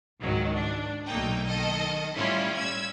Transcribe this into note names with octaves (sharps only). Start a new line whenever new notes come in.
C#2 G#2 D#3 F#3
D4
B1 A3 A#3 D#4 G5
D#3 A4 D#5
A2 G3 C#4 E4 F4
E6 G#6